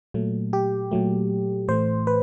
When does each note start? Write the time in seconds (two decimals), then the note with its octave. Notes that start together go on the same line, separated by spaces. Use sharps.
0.14 A#2 F#3 A3
0.53 G4
0.91 A#2 F#3 A3
1.68 A2 E3 A3 C5
2.07 B4